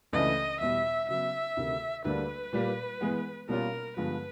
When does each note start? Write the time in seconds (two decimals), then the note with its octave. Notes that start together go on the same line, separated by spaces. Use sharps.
0.13 C#2 C#3 E3 A3 D4 D#5
0.60 E2 B2 G3 E5
1.09 C#3 F#3 B3 E5
1.56 D2 C3 D#3
2.04 D2 D3 G3 A#3 D4 B4
2.53 A#2 G3 A#3
3.01 E3 G#3 B3
3.49 B2 G3 A#3 C#4 F4 A#4
3.97 G2 D3 F3 G#3 B3 B4